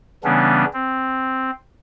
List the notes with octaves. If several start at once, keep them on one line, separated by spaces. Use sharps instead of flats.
C#3 E3 G3 B3 C#4 D4
C4